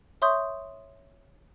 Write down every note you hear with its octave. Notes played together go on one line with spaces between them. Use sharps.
C#5 E5 C6 C#6 D#6 G6